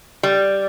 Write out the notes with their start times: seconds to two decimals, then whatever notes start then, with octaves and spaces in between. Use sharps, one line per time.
0.23 G3